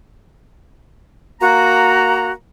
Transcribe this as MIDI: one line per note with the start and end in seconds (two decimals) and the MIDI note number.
1.41 2.31 58
1.41 2.32 66
1.41 2.31 82